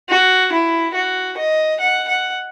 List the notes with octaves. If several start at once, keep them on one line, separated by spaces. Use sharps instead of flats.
F#4
E4
F#4
D#5
F#5
F#5